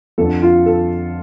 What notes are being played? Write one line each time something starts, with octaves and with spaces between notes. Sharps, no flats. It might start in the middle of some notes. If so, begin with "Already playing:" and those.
F2 D3 A4
F4
A4